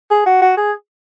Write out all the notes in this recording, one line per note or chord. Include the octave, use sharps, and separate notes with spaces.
G#4
F#4
F#4
G#4